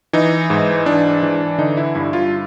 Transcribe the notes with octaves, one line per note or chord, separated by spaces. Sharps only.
E3 D#4
G#2
E3 D4
E3
D3 D#4
E4
G2 E4
F4